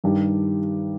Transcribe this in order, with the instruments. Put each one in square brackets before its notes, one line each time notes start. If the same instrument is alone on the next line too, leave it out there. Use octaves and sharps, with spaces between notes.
[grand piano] G2 D#3 G3 D4 G4